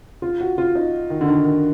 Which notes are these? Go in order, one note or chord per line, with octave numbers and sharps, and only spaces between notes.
F4
F#4
F4
D#4
D#3
D3
D#3
D#3